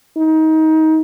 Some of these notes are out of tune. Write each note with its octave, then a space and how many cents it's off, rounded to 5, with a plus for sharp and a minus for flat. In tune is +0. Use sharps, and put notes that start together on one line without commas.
D#4 +25